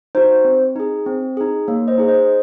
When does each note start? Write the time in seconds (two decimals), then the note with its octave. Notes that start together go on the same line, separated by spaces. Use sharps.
0.15 D#4 F#4 C5
0.45 C4
0.76 D#4 G#4
1.06 C4
1.37 D#4 G#4
1.68 A#3 C#5
1.88 C5 D#5
1.98 D#4 G#4
2.08 C5 D#5